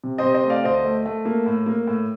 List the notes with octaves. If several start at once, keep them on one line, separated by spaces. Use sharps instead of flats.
C3
C3 C5 D#5
C5 D#5
A3
D5 F5
D2 C5 D#5
A3
A3
A#3
A2
A#3
A2